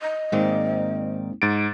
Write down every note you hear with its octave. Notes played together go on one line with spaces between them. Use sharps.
D#5
G#2 D#3 G#3 A#3 C4 D5
G#2 A6 D7